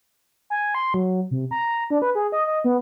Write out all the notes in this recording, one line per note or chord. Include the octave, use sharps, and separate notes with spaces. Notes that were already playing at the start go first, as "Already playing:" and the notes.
G#5
C6
F#3
C3
A#5
D4
B4
G#4
D#5
D#5
B3